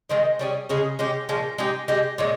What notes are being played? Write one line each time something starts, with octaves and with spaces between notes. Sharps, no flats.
D#3 G#3 C4 D#4
G3 C#4 G#4
C#3 G#3 C#4 G#4
G#3 C#4 G4
A#2 F3 G#3 C#4
G#3 D#4 G4
G#3 D#4 G4
A#2 G#3 C#4